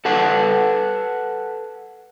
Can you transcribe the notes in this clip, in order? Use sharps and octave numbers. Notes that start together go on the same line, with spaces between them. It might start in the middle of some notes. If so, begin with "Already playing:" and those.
A4 B4 F#5 A5